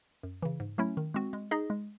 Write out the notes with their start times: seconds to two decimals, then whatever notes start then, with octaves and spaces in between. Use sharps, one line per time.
0.23 F#2
0.42 C#3 E3
0.60 G#2
0.78 F#3 A3 C#4 E4
0.97 D#3
1.14 G#3 C4 F#4
1.33 G#3
1.51 D#4 G#4 D#5
1.70 G#3